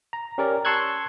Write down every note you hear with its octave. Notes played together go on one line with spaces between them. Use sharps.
A#5
C#4 G4 A#4 D5
A5 C6 C#6 E6 F#6 G#6